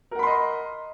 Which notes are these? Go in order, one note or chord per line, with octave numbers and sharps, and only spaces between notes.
A#4 D#5 F#5 B5 C6